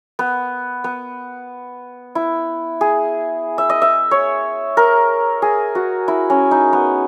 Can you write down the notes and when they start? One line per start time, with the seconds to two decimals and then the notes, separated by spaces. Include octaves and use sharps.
0.19 B3
0.84 B3
2.15 E4
2.81 G#4
3.58 E5
3.70 D#5
3.82 E5
4.11 C#5
4.77 A#4
5.42 G#4
5.75 F#4
6.08 E4
6.30 C#4
6.51 D#4
6.73 B3